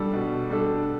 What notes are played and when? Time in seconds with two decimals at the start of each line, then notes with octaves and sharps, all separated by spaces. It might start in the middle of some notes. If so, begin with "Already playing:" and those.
Already playing: B2 G3 D4 A4
0.13 B2
0.50 G3 D4 A4